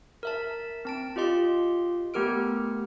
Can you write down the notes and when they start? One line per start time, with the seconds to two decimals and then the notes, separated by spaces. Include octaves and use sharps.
0.23 A#4 E5 A5
0.85 C4 A5 D7
1.16 F4 G4 D#5 C6
2.14 A3 B3 G4 A#4 F6 D7